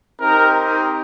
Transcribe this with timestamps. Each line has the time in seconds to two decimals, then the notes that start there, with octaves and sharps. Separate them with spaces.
0.20 C4 D#4 G4 A#4